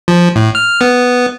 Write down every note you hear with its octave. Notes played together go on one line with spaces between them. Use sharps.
F3
A2
F6
B3